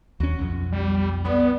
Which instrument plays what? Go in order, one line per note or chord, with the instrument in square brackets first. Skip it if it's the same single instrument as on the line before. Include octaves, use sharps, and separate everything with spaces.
[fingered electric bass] D#2 C#4 [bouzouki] F#4
[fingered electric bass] B1 F2
[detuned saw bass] G3
[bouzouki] D3 D4 E4 [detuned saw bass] B3